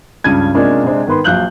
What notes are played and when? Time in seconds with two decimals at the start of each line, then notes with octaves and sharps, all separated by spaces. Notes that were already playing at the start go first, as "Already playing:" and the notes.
0.24 C#2 G2 C#3 A5 G#6 D#7
0.54 C3 G#3 A#3 C#4 D4 F4
0.84 C3 G#3 C4 D4
1.06 G#2 D#3 B3 B4 C6
1.24 A#1 F#3 F5 F#6 G6 F#7